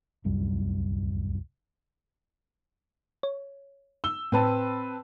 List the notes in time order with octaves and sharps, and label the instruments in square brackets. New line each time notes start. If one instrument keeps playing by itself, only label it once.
[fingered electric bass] D1 C2 F#2 G3
[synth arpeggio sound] C#5
[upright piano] E6 G7
[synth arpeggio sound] A2 [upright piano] C4 B4 A5